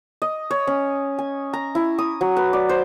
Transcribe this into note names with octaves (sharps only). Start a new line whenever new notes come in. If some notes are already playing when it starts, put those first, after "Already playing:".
D#5
C#5
C#4
G#5
A#5
E4
D#6
F#3
B4
D5
C5